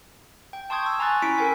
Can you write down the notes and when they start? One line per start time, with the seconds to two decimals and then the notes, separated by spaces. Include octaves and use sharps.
0.53 G5
0.70 A5 C6 C#6 D#6 G6 G#6
0.86 E6
0.99 G#5 A#5 C6 C#6 F#6 A6
1.22 C#4 E4 B6 C#7 D7
1.38 A4 A#4 G5 G#5